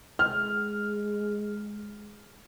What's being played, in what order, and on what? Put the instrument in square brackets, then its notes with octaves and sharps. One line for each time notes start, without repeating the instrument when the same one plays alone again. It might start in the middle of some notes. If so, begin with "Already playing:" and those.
[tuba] G#3 [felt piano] F6